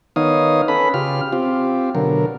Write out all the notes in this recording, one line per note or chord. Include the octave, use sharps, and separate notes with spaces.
D#3 B3 D#4 C#5 F5 D#6
C#4 A4 B4 B5
C#3 F4 G4 F6
C4 F4 G4
B2 D3 F#3 A#4